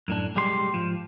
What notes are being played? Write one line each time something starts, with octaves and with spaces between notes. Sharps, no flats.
F#2 A2 D4
B1 G3 G#3 G4 B4 C6
G#2 F3